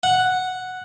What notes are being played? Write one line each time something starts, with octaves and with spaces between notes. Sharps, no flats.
F#5